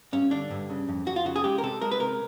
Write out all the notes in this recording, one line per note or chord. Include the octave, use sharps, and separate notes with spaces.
G2 C#4
D3 D4
G2
C#3
F2
F2 F#4
F4
C#3 F#4
G#4
G#3 G4
A#4
C3 A4
G#3 A#4
B4
C3 A#4